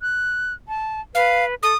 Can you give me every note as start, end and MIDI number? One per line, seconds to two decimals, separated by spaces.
0.01 0.54 90
0.68 1.01 81
1.15 1.55 71
1.15 1.44 77
1.63 1.73 69
1.63 1.77 87